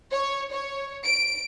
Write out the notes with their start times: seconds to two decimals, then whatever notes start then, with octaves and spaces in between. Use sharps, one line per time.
0.11 C#5
0.51 C#5
1.03 D7